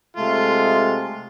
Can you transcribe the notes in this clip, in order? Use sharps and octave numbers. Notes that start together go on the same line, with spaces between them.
C3 G#3 A3 F4